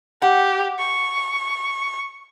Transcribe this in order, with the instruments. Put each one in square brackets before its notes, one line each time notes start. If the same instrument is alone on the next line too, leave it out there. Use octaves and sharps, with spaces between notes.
[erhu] G4 [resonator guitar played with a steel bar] F#5
[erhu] C#6